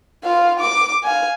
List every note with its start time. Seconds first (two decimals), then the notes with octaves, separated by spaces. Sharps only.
0.23 F4 F5
0.60 D6
1.03 F5 G#5